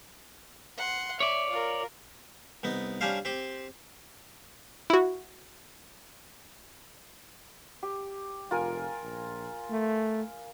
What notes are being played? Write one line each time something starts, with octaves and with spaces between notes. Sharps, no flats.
F#5 C6
C#5 D5 E5
F4 A#4
C2 B3 D#4
G3 C#4 D4 G4 C5 F5
C4 G4 C5
E4 F#4
G4
F1 F4 A#4 G#5
A#1
A3